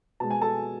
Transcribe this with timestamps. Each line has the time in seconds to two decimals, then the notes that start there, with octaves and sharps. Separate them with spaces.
0.20 B2 G#3 A5
0.30 G#5
0.41 A4 A5